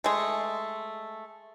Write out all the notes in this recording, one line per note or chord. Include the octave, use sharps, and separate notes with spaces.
G#3 A3